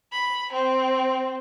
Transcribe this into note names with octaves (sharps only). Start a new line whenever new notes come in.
B5
C4